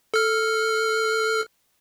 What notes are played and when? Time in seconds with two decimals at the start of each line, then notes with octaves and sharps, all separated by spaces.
0.14 A4 F6